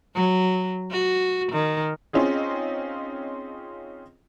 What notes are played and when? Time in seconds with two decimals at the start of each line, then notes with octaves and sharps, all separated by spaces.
0.15 F#3
0.91 F#4
1.52 D#3
2.13 C4 C#4 D#4 F4 G#4